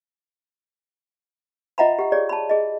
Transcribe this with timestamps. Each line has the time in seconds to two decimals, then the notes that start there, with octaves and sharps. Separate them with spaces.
1.78 F4 D#5 E5 F#5 A#5 B5
1.99 G4 F#5
2.12 G4 G#4 C#5 D5
2.29 A5 B5
2.49 G#4 D#5